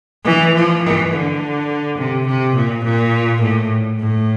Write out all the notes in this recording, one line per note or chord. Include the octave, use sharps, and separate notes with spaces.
E3
F3
E3
D3
C3
C3
A#2
A#2
A2
A2